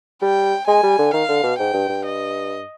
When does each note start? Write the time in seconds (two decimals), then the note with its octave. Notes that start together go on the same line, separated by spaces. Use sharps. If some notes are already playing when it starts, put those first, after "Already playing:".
0.22 G3 G5
0.67 G#3 G#5
0.83 G3
0.99 D3
1.13 D#3 F5
1.29 D3
1.44 B2
1.58 G#2 G5
1.74 G2
1.89 G2
2.05 D#5